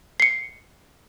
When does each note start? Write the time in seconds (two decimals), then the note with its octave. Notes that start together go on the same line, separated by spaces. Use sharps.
0.20 C7 C#7